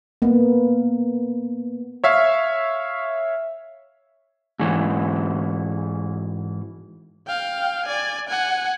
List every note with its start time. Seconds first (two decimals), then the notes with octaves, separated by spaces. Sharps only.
0.22 A#3 B3
2.04 C#5 E5 F5
4.59 G#2 E3
7.27 F5 G5
7.86 D5 G#5
8.29 F#5 G#5